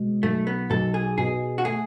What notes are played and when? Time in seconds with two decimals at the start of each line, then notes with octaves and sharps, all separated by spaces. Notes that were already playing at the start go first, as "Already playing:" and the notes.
Already playing: B2 G#3
0.23 B1 A3
0.47 B3
0.70 B1 A4
0.94 G#4
1.18 B2 G#4
1.58 F#4
1.65 A3 G#4